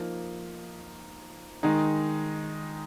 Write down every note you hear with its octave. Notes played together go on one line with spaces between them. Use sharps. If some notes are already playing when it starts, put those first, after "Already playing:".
Already playing: F3 A#3 D#4
D#3 G#3 D#4